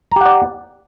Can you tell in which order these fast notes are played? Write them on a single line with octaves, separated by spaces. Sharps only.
A#5 G4 F#5 D5